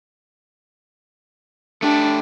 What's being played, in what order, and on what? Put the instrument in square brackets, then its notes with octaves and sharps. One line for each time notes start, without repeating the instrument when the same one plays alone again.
[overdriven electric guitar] A3 G4 [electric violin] D4